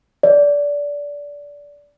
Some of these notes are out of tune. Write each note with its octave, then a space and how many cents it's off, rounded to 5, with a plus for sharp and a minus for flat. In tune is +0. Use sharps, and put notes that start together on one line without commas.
D5 -20